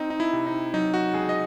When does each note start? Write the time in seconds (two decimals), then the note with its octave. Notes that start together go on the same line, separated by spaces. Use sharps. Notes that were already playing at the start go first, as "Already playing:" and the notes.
Already playing: C4 D#4
0.10 D#4
0.20 E4
0.33 C3
0.46 D#4
0.74 F#3 D#4
0.94 F#4
1.13 C#2 G#4
1.29 D#5